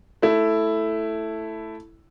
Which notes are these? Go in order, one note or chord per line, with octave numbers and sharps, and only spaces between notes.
A3 E4